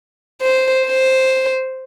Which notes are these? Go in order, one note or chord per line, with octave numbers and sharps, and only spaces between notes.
C5
C5